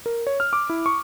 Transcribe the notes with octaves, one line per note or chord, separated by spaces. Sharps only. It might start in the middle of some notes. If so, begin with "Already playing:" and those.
A#4
C#5
F6
D6
E4
C#6